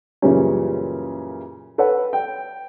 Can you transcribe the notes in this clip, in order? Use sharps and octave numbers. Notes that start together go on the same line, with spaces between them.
F#2 A#2 C#3 E3 G3 C#4
A4 B4 C#5 F#5
G5